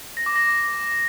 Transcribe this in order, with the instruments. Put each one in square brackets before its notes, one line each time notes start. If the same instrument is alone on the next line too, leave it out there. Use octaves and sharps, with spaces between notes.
[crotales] A#6
D6
A#6